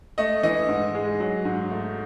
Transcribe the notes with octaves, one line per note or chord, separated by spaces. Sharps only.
A3 D#5
E3 D#5
G#2
G#3
F#3
G#2
A3